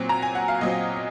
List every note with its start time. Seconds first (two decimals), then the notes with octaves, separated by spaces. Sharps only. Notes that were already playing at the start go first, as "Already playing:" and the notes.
Already playing: A#2 F#3 C4
0.09 A#5
0.22 G#5
0.35 F#5
0.48 F5
0.61 A#2 F#3 C4 D#5